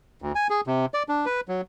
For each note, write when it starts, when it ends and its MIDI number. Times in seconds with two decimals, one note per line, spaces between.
0.22 0.32 38
0.35 0.47 80
0.50 0.61 68
0.67 0.86 48
0.94 1.03 74
1.09 1.26 62
1.26 1.41 71
1.49 1.61 54